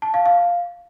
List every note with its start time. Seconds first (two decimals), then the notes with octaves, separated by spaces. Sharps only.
0.02 A5
0.14 F5
0.26 F5